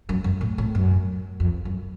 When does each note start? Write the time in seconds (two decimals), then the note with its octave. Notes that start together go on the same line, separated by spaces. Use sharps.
0.09 F#2
0.24 F#2
0.41 A2
0.58 A2
0.75 F#2
1.40 F2
1.65 F#2